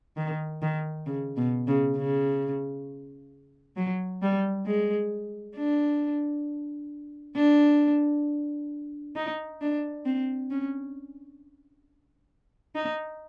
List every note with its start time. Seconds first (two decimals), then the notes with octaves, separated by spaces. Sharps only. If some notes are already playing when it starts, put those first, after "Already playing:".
0.17 D#3
0.62 D#3
1.06 C#3
1.37 B2
1.67 C#3
1.97 C#3
3.76 F#3
4.22 G3
4.66 G#3
5.56 D4
7.36 D4
9.16 D#4
9.61 D4
10.06 C4
10.51 C#4
12.75 D#4